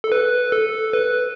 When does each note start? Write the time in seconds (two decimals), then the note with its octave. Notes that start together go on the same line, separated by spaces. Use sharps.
0.04 A4
0.12 B4
0.52 A4
0.93 B4